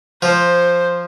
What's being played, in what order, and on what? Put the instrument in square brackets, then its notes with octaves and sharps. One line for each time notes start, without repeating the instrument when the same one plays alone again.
[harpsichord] F3 [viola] C5